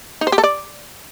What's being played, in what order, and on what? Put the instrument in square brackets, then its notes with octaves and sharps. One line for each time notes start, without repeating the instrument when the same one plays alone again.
[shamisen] D#4
C5
G4
A4
D5